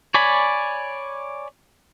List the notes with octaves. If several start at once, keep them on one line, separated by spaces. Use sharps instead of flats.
C#5 D5 G#5 B5